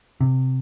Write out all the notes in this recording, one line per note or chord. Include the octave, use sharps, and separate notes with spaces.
C3